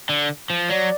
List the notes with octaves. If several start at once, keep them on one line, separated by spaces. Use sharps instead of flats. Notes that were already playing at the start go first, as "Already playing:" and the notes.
D3
F3
F#3 D5